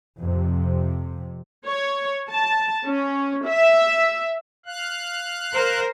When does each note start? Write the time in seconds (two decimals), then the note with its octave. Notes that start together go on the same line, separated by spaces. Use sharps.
0.19 F2 C3
1.67 C#5
2.31 A5
2.86 C#4
3.47 E5
4.66 F5 F#6
5.53 A#4 C5